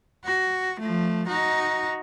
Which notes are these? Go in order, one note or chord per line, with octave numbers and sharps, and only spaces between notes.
F#4
F3 A3
D#4 F#4